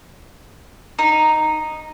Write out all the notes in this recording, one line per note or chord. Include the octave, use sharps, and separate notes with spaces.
D#4